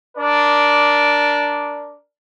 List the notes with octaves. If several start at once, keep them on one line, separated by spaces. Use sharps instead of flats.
D4 A#4 D5